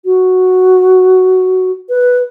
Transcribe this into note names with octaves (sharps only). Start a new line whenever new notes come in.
F#4
B4